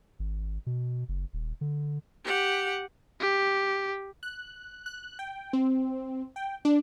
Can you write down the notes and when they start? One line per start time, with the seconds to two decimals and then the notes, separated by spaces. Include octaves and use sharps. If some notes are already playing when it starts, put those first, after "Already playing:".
0.19 G#1
0.66 B2
1.09 F#1
1.33 D#1
1.61 D3
2.24 G4 F#5
3.21 G4
4.23 F#6
4.86 F#6
5.19 G5
5.53 C4
6.36 G5
6.65 D4